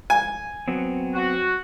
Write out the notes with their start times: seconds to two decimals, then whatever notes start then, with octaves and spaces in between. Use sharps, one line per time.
0.10 G#5
0.68 F#3 B3 C4
1.15 F#4